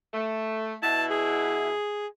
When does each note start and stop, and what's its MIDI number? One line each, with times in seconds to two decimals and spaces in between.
0.13 0.74 57
0.83 1.70 47
0.83 1.70 64
0.83 1.04 81
1.10 2.07 68